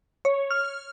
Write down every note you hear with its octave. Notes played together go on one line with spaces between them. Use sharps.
C#5
F6